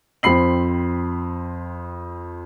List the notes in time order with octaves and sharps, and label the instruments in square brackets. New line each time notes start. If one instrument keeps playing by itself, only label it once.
[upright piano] F2 C4 B5 C7 F#7